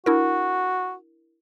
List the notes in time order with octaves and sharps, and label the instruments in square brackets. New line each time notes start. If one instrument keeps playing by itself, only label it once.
[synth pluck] D4 E4 A#4 [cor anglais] F#4